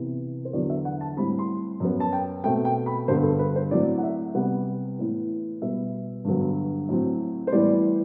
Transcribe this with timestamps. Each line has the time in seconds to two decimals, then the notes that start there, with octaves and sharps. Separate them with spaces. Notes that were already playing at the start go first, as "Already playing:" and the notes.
Already playing: C3 E3 B3
0.45 C5
0.53 E2 D3 F#3 B3 D5
0.70 E5
0.85 F#5
1.01 A5
1.17 A2 G3 C4 B5
1.39 C6
1.80 F#2 F#3 B3
2.00 A5
2.13 G5
2.44 B2 A3 C4 G5
2.65 G5
2.86 B5
3.08 G2 D3 G3 B3 C5
3.23 A4
3.39 B4
3.56 C5
3.71 A2 F#3 C4 D5
3.98 F#5
4.03 E5
4.35 C3 G3 B3 F#5
4.99 A2 E3 B3
5.62 B2 G3 B3 E5
6.25 G2 D3 F#3 B3
6.89 A2 F#3 C4
7.47 C5
7.52 A2 E3 G3 B3 D5